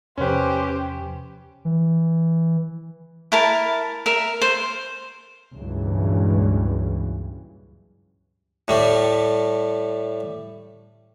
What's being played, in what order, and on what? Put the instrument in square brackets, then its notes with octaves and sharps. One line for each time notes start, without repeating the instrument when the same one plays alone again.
[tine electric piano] E2 C3 F3 [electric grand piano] C#4 B4 [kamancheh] G4 C5
[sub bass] E3
[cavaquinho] E4 A#4 A5
A#4 E5
C5
[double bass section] C#2 G2 A#2 E3 F#3
[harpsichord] A2 G3 A3